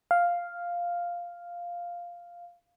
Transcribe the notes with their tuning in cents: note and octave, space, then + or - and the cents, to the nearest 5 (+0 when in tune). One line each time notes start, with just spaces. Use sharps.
F5 +0